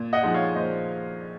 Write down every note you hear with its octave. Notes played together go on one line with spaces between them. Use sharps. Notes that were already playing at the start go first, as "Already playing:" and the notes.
Already playing: A#2
D#5 F#5
F3 G#3 D#4 F#5
C#5 F5
A#2 C5 D#5